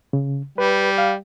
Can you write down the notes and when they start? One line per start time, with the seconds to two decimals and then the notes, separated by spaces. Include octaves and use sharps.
0.13 C#3
0.58 G3 B4
0.98 F5